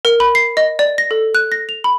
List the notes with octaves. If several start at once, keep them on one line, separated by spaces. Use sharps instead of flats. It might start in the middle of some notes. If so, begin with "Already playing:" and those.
A#4
B5
C7
D#5
D5
A#6
A4
F#6
A#6
F7
B5